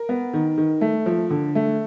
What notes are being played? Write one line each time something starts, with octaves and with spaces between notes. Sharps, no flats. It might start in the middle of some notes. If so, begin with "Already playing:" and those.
Already playing: A#4
B3
D#3
D#3
A3
F3
D3
A3